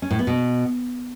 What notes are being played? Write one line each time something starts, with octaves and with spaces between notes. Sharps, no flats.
C#4
A2
B3
B2